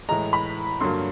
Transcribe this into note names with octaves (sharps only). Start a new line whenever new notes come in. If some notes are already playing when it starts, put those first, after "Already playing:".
A2 E3 G#3 A#5
B5
G2 D3 F#3 A#3 C6